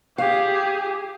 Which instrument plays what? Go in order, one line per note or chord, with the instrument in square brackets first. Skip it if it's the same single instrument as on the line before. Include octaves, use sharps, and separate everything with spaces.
[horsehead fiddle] G4 G#4 [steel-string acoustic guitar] F5